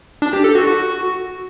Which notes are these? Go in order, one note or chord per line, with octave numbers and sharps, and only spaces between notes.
D4
G4
A4
F#4
F#4